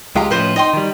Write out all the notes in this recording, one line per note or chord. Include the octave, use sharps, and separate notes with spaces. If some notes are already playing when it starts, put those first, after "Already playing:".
C#2 G#3 F4 G4 A#5
A2 F3 C#4 B4 C5 D#5
D#4 D#5 G5 C6
D#3 G3